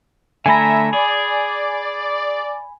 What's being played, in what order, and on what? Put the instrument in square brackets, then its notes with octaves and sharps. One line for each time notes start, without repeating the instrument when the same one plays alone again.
[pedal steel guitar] D3 A3 A#5 [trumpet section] E5 [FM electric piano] G#5 B5
[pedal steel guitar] G#4 [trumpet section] D5